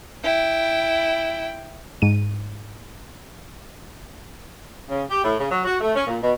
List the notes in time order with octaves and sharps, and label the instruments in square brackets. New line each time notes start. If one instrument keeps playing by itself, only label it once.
[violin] E4 G5
[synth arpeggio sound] G#2 D#7
[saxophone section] C#3
G4
A2
C#3
F#3
F#4
A3
C#4
A#2
B2